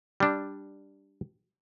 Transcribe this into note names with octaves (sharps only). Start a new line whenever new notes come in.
G3 D4